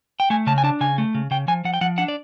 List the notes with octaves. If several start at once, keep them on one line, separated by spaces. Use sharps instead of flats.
G5
A3 G#5
C#3 A5
G#5
D4 A5
C#3 G#5
A3
C#3
C#3 G5
F3 G#5
F3 F#5
G5
F3 F#5
D4 F#5
D5